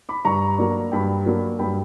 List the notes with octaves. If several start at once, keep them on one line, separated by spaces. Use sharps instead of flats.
B5 D6
G2 A#5 C#6
F#3 A#3 D4
G2 G5 B5
F#3 A#3 D4
G2 G5 B5